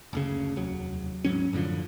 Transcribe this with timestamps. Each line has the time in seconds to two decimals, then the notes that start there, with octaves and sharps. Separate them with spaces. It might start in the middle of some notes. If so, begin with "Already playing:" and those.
0.13 F#1 D2 C#3
0.56 F1 D#2 F#3
1.25 D1 G#2 F#3 C#4
1.53 F#2 A2 D3 F3